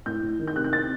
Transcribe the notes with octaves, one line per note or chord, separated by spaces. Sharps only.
A2 G6
A2
D#3
G6
C3 F#6
G6
C4 A6